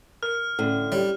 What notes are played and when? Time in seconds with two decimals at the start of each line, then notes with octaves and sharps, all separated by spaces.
0.23 A#4 F6
0.59 A2 D3 C#4
0.92 G3 C#5